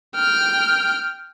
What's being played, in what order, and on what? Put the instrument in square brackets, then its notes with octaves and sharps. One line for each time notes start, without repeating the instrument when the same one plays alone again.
[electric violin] G5 F6